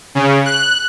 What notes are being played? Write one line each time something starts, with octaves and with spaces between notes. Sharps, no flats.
C#3
F#6